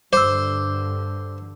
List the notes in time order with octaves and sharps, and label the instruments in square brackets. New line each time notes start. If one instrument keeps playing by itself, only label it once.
[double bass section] G2 D3 [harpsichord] C5 [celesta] D6 E6